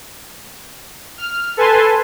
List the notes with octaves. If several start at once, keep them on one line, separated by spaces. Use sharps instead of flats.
F6
A4 B4 G#5 A5 C6